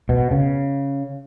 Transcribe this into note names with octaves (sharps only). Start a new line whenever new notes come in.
B2
C#3